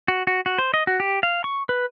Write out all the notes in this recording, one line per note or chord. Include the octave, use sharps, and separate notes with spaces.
F#4
F#4
F#4
C5
D#5
F#4
G4
F5
C#6
B4